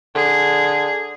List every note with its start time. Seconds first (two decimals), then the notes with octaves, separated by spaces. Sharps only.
0.15 D3 G#4